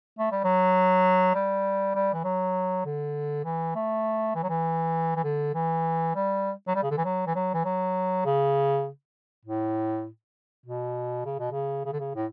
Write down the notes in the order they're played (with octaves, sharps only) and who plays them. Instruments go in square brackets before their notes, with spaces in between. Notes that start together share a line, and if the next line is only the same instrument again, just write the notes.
[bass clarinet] A3
G3
F#3
G3
G3
E3
F#3
D3
E3
A3
E3
F#3
E3
E3
D3
E3
G3
F#3
G3
C#3
D3
E3
F#3
E3
F#3
E3
F#3
C#3
A2
B2
C#3
B2
C#3
C#3
D3
C#3
A2